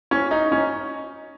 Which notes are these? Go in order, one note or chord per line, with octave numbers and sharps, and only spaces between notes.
C#4
D#4
C#4